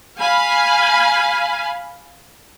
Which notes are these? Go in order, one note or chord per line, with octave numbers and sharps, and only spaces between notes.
F5 G#5 B5